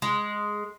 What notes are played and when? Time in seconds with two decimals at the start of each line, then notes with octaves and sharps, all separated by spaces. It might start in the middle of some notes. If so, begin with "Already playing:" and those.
0.02 G#3